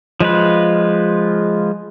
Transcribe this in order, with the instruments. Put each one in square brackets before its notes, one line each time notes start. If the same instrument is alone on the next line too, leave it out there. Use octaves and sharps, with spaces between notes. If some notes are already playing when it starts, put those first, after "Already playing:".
[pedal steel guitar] F3 G#3 F4 B4